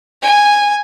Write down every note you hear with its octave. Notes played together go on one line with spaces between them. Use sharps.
G#5